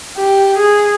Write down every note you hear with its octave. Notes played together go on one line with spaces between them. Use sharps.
G4
G#4